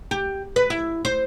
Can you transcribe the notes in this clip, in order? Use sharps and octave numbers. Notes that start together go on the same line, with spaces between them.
G4
B4
E4
C5